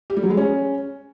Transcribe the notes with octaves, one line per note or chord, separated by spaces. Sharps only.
G4
G3
F#3
G#3
C#4